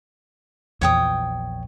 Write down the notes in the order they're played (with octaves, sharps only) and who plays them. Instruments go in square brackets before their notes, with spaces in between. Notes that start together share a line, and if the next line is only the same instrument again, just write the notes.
[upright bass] A#1 E2 [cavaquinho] C#5 G5 D#6